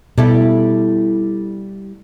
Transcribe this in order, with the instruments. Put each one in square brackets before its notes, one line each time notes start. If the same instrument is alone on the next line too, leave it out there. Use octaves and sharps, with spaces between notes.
[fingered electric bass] B2 [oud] G3 E4 A4